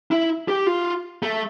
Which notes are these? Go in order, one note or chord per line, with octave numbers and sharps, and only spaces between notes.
E4
G4
F4
A3